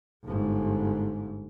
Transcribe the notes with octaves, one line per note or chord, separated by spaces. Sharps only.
G1 G#2